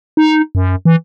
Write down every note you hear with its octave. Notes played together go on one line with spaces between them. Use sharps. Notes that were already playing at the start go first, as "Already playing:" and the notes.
D#4
F#2
E3